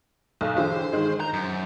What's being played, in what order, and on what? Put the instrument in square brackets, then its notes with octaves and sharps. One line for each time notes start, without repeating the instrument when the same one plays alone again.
[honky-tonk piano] B1
[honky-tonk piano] D3 E3 G4 [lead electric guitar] C5
[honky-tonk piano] D#3 G#3
[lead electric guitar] A#5 [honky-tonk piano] G6
[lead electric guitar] F#2